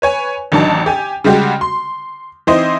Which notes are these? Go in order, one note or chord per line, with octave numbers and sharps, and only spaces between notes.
B4 C#5 G#5
A1 D#3 F#3 D4 D#4 A5
G4 G#5
C#3 G3 G#3 F#4 G4
C6
E3 C4 D#4 E4 C5 D#5